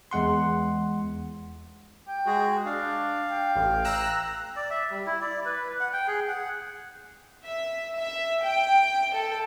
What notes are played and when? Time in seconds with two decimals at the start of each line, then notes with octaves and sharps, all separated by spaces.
0.11 E2 G#3 F#5 C6
2.07 G5
2.26 G#3 F#4 G#4
2.66 D4 F5
3.31 G5
3.55 A1
3.84 A#5 E6 F#6
4.56 D5
4.70 E5
4.90 G3
5.06 E4
5.22 D5
5.45 B4
5.80 F#5
5.93 G5
6.08 G#4
6.28 F#5
7.42 E5
7.96 E5
8.43 G5
9.14 A4